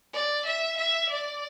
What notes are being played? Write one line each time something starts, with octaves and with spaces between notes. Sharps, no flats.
D5
E5
E5
D5